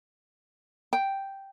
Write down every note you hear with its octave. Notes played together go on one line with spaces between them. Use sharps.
G5